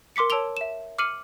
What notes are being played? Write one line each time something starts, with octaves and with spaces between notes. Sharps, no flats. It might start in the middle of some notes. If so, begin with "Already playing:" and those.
A#4 C6 D6 B6 C#7
C#5 A5 E6 D7 F7 G7
E5 E7
D6 F6 C7 C#7 D#7 F#7